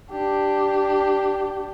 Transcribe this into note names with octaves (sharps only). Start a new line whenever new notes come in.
D4 G4